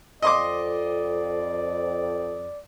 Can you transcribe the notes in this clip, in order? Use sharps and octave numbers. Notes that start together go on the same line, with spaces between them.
F2 D5 D#5 C6 D6